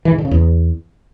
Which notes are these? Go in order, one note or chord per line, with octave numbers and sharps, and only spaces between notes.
E3
G#2
D3
C#3
E2